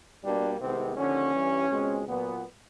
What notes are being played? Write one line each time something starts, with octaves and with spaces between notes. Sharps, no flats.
B2 G3 A#3 D4
C2 C3 D#3 G#3 B3 C4
D#2 D3 F3 C#4
G2 E3 G3
C#2 B2 G#3 C4
A#2 F#3 B3